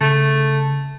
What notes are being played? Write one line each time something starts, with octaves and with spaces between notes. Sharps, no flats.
C#3 A3